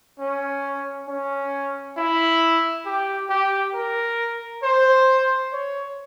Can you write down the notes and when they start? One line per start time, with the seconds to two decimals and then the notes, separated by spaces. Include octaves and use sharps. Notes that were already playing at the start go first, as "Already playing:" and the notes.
0.20 C#4
1.08 C#4
1.97 E4
2.86 G4
3.30 G4
3.74 A#4
4.63 C5
5.52 C#5